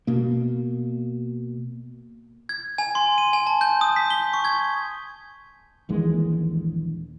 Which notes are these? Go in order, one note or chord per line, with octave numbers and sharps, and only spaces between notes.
B2 A#3
G#6
G#5
C6
D#7
G#5
A5
G6
D#6
B6
G7
C#6
G#6
A#1 D#2 E3 G#3